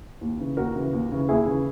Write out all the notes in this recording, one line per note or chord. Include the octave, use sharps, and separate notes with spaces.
D#2
C#3 E3
D#2 F#4 A#4
C#3 E3
D#2
C#3 E3
D#2 E4 G#4
C#3 E3